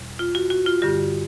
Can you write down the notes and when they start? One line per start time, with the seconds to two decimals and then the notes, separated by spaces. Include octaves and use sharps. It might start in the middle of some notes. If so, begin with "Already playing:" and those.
Already playing: E2 B2 G3
0.19 F4
0.35 F#4
0.50 F#4
0.66 F4
0.82 G2 D3 G3 G4